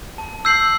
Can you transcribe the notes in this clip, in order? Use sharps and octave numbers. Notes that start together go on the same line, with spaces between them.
A5
E6 G6 C7 F#7